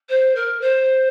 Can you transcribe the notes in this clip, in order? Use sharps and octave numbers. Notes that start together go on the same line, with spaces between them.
C5
A#4
C5